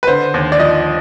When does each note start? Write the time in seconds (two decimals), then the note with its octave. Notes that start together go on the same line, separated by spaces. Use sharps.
0.03 B4
0.07 D3 C5
0.34 D#2
0.52 D5
0.60 F3 D#5